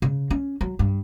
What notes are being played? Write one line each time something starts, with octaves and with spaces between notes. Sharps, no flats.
C#3
C#4
F#3
G2